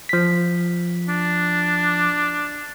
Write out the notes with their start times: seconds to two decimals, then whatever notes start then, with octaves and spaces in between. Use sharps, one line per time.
0.09 F3 B6
1.08 D4